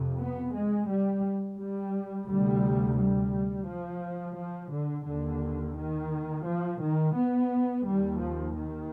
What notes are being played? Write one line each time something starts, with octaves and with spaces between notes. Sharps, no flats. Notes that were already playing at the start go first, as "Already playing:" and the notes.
Already playing: F2 C3
B3
G#3
G3
G3
D2 C3 G3
G3
F3
F3
D3
D#2 D3
D#3
F3
D#3
B3
D#2 G3
F3
D#3